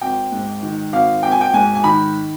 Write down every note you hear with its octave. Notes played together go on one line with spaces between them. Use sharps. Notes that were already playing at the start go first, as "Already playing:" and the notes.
G#1 G5
G#2
D#3
G#1 F5
G#1 G5
G#5
G5
G#2 G#5
G#5
D#3 B5